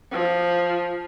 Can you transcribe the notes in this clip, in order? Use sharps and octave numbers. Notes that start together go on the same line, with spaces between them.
F3